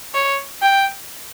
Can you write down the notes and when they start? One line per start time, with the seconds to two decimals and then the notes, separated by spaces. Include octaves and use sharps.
0.14 C#5
0.62 G5